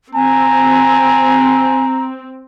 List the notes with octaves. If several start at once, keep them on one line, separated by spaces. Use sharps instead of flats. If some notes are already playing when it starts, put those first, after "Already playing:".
C4 G#5 A#5